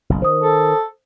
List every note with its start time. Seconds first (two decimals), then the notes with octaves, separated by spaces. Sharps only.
0.10 F#1 B1
0.22 D#3 C5 D#6
0.41 A4